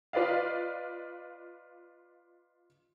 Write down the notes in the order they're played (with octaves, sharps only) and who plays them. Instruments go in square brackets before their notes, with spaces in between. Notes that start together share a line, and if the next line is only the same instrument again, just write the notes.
[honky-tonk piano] F4 B4 D5 D#5 F5